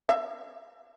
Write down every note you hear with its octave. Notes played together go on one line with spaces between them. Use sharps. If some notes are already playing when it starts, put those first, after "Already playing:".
E5